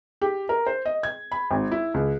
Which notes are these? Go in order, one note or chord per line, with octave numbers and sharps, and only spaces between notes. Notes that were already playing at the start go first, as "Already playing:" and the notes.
G4
A#4
C5
D#5
G#6
B5
G#1
E4
C#2